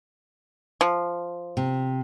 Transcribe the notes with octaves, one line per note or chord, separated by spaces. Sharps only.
F3
C3